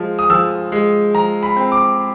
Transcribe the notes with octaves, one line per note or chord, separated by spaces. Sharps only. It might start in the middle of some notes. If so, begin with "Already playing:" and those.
Already playing: F3 G#3
D#6
F3 E6
G#3
F3 A#5
B5
C4
D6